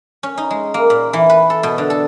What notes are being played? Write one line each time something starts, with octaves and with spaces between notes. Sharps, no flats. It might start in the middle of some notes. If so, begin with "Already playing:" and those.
C#4
D#4
G#3
A#3
A#2
E3
B4
A4
B2
D3
A4